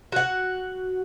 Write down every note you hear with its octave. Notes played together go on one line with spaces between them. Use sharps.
F#4 F#5